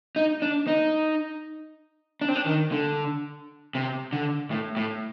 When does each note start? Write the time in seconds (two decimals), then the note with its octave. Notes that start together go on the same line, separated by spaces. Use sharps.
0.16 D#4
0.42 D4
0.67 D#4
2.21 D4
2.28 C4
2.36 D4
2.46 D#3
2.72 D3
3.75 C3
4.13 D3
4.51 A2
4.77 A2